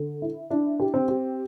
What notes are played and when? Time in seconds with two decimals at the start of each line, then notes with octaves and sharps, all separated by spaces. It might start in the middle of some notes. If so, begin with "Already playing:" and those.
Already playing: D3
0.22 E4
0.50 D4 E4
0.80 G4
0.94 C4
1.08 G4